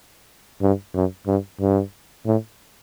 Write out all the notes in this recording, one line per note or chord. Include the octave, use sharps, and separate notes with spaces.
G2
F#2
G2
G2
A2